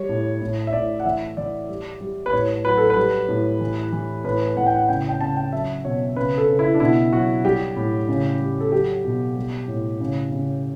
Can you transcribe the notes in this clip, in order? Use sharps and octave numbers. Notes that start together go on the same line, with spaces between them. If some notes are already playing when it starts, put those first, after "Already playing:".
Already playing: G3 C#5
A2
A2
E5
A2 D5
F#5
E3 E5
E3 D5
G3
G3
B4
A2 C#5
F#3 B4
A4
B4
G3
A2
E3
E3
A2 B4
A2 F#5
G5
F#5
C#3 G5
G5
C#3 A5
G5
F#3 E5
B2 C#5
C#3 B4
A4
C#3
E4
D4
B2 E4
F#3 F#4
G3 G4
A2
C#3
G3
A4
F#3 G4
B2
G3
A2
C#3
C#3